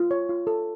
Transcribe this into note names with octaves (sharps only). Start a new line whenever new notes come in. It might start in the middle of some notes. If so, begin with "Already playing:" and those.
Already playing: F4
C#5
F4
A4